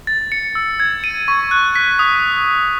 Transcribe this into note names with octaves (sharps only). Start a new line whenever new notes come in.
A6
C#7
E6
G#6
D#7
C#6
F#6
B6
D#6